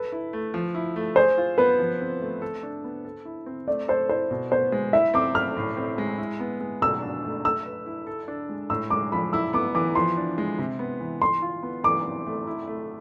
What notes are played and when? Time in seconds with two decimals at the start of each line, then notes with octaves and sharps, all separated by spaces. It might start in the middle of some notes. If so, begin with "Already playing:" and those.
Already playing: A4 B4
0.12 E4
0.33 A3
0.54 F3
0.75 E4
0.96 A3
1.16 G#4 C5
1.38 F4
1.58 B3 B4
1.79 F3
2.00 C4
2.21 A3
2.42 A4
2.63 D4
2.84 B3
3.05 A4
3.25 E4
3.46 C4
3.67 A3 D5
3.88 A4 C5
4.09 E4 C5
4.31 B2
4.51 B3 C5
4.72 G#3
4.93 E4 E5
5.14 C4 D6
5.35 A3 F6
5.57 A2
5.77 C4
5.98 G#3
6.18 E4
6.40 B3
6.61 G#3
6.82 B2 E6
7.02 D4
7.24 A3
7.45 A3 E6
7.65 B4
7.86 E4
8.07 A4
8.28 D4
8.49 G#3
8.70 A2 E6
8.90 G#3 D6
9.12 F3 B5
9.33 E4 E6
9.53 B3 D6
9.75 E3 D6
9.95 F3 C6
10.17 D4
10.38 G#3
10.59 C3
10.79 B3
11.00 E3
11.21 E3 C6
11.42 F4
11.63 B3
11.84 E3 D6
12.05 C4
12.26 A3
12.47 E4
12.67 A3